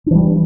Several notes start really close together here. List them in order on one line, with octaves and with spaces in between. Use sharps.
D4 E3 G3